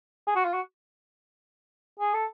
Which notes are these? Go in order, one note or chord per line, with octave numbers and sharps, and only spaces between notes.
G#4
F#4
F4
F#4
G#4
A4